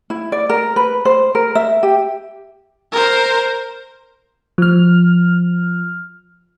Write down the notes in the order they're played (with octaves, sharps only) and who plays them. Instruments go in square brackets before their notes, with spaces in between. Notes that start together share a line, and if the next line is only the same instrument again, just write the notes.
[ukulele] E4
D5
A#4
B4
C5
A#4
E5
G4
[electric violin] A#4 C5
[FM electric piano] F3 F6